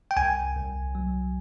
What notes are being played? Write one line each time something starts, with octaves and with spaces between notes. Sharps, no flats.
G5
C2 G#5
C2
F#3